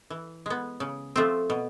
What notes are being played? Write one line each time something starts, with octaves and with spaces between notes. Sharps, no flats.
E3
G#3 B3
C#3
F3 A3 C4
B2